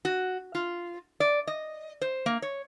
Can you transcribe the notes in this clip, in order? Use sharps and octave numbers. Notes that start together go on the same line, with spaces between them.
F#4
F4
D5
D#5
C5
A#3
C#5